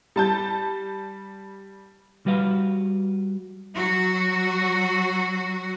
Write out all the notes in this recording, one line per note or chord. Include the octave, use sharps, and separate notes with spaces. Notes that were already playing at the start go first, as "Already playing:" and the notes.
G3 A5 G6
G3 F#4 B4 F5
F#3 F#4